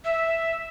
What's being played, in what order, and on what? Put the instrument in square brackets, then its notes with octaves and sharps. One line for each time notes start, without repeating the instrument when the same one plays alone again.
[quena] E5